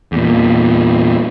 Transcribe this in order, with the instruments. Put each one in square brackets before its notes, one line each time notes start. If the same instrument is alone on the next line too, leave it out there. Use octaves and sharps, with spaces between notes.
[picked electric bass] E2 A#2